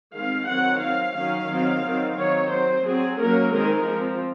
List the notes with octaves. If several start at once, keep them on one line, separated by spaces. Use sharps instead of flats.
D#3 G#3 C4 F5
D#3 F#3 C4 F#5
F#3 C4 F5
D#3 F#3 C#4 F5
D#3 F#3 C4
D#3 F#3 C4
D#3 F#3 C4 C#5
F#3 C4 C5
F#3 C4 G#4
F#3 A#3 C#4 A#4
D#3 G#3 C4 A#4
F3 C4